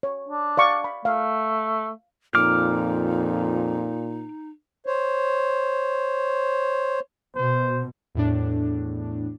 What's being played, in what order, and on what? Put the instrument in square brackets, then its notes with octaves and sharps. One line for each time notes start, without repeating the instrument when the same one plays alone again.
[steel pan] C#5
[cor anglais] D4
[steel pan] D5 F5 C#6
B5
[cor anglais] A3 [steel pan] F5
[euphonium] F2 [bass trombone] A#2 [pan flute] D#4 [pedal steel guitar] D6 F6
[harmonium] C5 C#5
[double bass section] B2 [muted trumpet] C5
[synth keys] E2 A2 D4